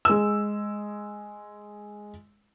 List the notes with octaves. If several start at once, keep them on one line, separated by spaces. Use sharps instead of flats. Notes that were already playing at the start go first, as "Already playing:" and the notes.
G#3 E6